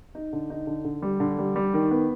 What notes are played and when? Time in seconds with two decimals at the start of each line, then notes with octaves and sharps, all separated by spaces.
0.15 D#4
0.33 D3
0.50 D#4
0.67 D3
0.85 D3
1.02 G3
1.20 D3
1.38 G3
1.56 G3
1.74 D#3
1.91 B3